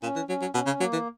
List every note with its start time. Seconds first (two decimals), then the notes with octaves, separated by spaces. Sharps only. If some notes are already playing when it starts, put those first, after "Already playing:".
0.03 A#2 C#4
0.16 E3
0.28 F#3 C#4
0.42 F#3
0.54 B2 C#4
0.66 C#3
0.80 F#3 A#3
0.93 E3